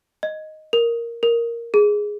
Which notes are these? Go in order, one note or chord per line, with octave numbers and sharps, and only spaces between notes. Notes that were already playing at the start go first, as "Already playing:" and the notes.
D#5
A#4
A#4
G#4